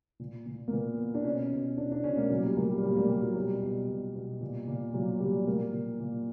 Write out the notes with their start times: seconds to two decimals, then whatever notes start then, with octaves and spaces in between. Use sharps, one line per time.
0.20 A#2
0.46 A#2
0.68 A#3
0.72 A#2 B3
0.99 A#2
1.14 D4
1.24 B2 C#4
1.52 B2
1.77 B2 D4
1.91 D4
2.04 B2 C#4
2.17 A#3
2.30 A#2 F#3
2.44 G3
2.57 A#2 A#3
2.69 G3
2.83 A#2 G3
2.96 A#3
3.09 A#2 G3
3.23 F#3
3.35 B2 G3
3.63 B2
3.89 B2
4.16 B2
4.41 A#2
4.68 A#2
4.94 A#2 F#3
5.20 A#2 G3
5.47 A#2 A#3
5.72 A#2
6.00 A#2